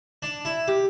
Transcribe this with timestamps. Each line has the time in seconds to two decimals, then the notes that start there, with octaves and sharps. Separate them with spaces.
0.22 D4
0.45 E4
0.68 G4